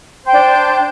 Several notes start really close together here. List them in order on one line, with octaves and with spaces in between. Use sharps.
C5 G5 D4